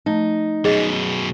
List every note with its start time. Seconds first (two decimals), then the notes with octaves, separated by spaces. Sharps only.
0.06 F3 A3 D#4
0.65 F#2 B2 G#4 D#5